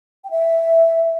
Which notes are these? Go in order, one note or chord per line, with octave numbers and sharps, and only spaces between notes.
G5
E5